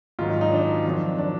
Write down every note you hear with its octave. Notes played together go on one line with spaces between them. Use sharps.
G#2 D#3 F#3 F4
D#4
D#4
D4
F2 D#3 F#3
D4